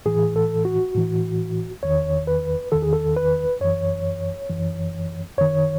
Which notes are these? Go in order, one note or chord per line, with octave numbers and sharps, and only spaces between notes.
A2 E3 G#4
A4
F#4
A2 E3
E2 D#3 C#5
B4
E2 D#3 A4
G#4
A4
B4
F#2 E3 C#5
F#2 E3
F#2 D#3 C#5